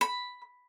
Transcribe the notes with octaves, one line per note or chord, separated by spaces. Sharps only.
B5